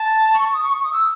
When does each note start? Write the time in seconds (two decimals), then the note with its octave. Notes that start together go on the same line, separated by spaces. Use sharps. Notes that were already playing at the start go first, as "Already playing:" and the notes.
Already playing: A5
0.34 C#6
0.44 C#6
0.54 D#6
0.63 C#6
0.73 C#6
0.83 D#6
0.93 E6